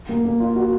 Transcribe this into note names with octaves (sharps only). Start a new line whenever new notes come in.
A#3
A#3
F4
F#4